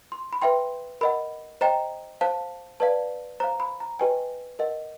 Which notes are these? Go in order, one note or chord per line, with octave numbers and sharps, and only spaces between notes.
C6
B5
B4 E5 G5 C6
A#4 D#5 F#5 B5
C5 D#5 G5 A#5
C5 F5 A5
B4 D5 F5 A5
C5 F5 A#5
B5
A#5
G4 B4 D#5 G5 G#5
A#4 D#5 F#5